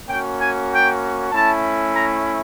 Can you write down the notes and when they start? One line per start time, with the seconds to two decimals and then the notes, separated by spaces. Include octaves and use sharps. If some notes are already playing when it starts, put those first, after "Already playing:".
0.09 A#3 C#4 F#4 G5
0.40 G#5
0.71 G5
1.32 A3 C#4 E4 A5
1.94 A#5